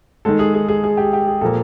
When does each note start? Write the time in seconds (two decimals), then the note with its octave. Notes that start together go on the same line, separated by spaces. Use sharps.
0.25 D#3 G#3 A4
0.39 G#4
0.54 G#4
0.68 G#4
0.84 G#4
0.97 G4
1.13 G4
1.27 G#4
1.41 A#2 F3 A#3 A4